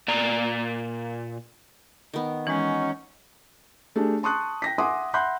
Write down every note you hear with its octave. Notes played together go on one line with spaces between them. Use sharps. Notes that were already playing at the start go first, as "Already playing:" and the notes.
A#2 D5 A#5
D#3 B3
E3 G#3 C#4 D#4 F#4
A3 D4 G4 G#4
A5 C6 C#6 D#6 F#6
G5 A#6 B6
E5 F#5 G#5 C6 D6 D#6
E5 F#5 B5 C6 F#6 G6